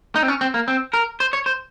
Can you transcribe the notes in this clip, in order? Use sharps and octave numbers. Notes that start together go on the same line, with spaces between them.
D#4
C4
C#4
C4
A#3
C4
A#4
C5
C#5
C5